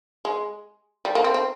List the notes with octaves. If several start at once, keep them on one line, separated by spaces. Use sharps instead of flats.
G#3
G3
A#3
C4
C4